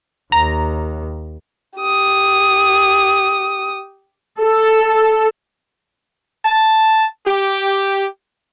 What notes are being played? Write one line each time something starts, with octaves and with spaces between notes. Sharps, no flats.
D#2 A#5
G4 D#6
A4
A5
G4